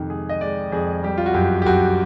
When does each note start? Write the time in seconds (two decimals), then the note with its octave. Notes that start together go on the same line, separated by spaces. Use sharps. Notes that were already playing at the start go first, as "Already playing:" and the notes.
Already playing: F2 C3 D#3
0.10 G#3 G#4
0.29 D#5
0.41 G#3 D5
0.72 F2 G#4
1.03 G3 G4
1.17 F4
1.26 F#4
1.34 F#2 G4
1.62 G4
1.66 F#2 F#4